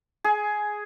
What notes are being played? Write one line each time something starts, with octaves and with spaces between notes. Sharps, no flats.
G#4